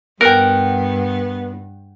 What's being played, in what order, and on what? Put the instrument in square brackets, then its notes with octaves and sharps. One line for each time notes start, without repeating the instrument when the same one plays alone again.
[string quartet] G2 [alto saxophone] B3 [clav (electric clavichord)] A#4 [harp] F#5 G5